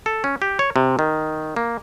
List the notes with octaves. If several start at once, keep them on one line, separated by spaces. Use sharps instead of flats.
A4
C#4
G4
C#5
C3
D#3
A#3